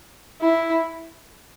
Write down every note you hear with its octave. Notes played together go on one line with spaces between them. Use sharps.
E4